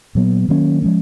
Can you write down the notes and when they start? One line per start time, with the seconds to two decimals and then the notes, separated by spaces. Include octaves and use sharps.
0.15 A#2 F#3 B3
0.49 D#3 F#3 A#3 C#4
0.82 F3 G#3 C#4